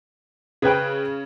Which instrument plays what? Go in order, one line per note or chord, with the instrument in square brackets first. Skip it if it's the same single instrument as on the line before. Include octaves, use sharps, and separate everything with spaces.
[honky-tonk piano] C#3 [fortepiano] G#4 B4 G5